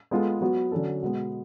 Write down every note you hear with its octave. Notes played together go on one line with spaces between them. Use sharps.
G#3 B3 F4 A4
F#3 B3 F#4
D3 F#3 C#4 F#4 A4
B2 G#3 B3